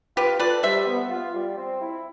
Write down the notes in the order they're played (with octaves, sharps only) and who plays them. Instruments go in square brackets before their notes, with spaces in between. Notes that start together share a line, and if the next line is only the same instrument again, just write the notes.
[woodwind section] F4 [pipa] G4 B4
[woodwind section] A4 [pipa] B4 D5
[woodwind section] G3 [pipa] C5 E5
[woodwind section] B3
F4
G3
C4
E4